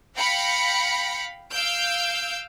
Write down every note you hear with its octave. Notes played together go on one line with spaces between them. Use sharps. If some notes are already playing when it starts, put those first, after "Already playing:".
F5 G5 B5 A#6 C#7
F5 E6 G6 D7